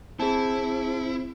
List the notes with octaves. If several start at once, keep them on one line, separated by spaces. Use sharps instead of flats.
C4 E4 G#4 A5